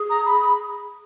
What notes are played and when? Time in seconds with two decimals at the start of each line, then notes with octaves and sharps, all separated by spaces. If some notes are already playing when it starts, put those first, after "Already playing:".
Already playing: G#4
0.10 A#5
0.26 B5
0.42 B5